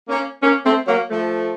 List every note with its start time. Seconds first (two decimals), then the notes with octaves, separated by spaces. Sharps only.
0.09 A#3 C#4
0.42 A#3 C#4
0.65 A3 C4
0.87 F#3 A#3
1.10 F3 A3